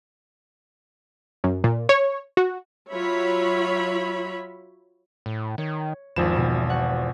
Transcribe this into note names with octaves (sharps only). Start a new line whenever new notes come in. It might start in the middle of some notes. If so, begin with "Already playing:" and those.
F#2
A#2
C#5
F#4
F#3 F4 C#5 E5 B5
A2
D#3 C#5
G#1 E2 F3 B4 B5 E7
B2
F#5 C#6